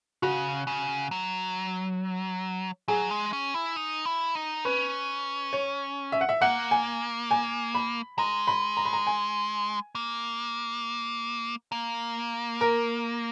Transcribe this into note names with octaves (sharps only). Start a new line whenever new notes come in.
C#3 F#4
C#3
F#3
F#3 G#4
G#3
C#4
E4
D#4
E4
D#4
C#4 B4
C#5
E5
F#5
E5
A#3 F#5
G#5
G#5
B5
G#3 A#5
B5
A#5
B5
A#5
G#5
A#3
A#3
A#4